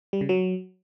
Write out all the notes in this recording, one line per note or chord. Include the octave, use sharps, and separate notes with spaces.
G3
C#3
F#3